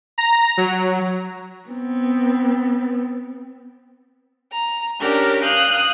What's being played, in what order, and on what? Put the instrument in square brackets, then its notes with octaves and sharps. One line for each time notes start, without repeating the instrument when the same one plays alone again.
[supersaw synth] A#5
F#3
[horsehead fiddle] B3 C4
[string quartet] A#5
C#4 D4 G4 A#4 C#5
F5 G5 D#6 F#6